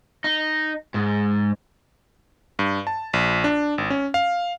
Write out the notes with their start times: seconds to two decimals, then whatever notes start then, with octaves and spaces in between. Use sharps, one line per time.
0.24 D#4
0.94 G#2
2.59 G2
2.87 A5
3.13 A#1
3.44 D4
3.78 G#1
3.90 C#4
4.14 F5